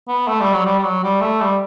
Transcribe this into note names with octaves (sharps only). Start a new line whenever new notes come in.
B3
A3
G3
F#3
G3
G3
F#3
G3
A3
G3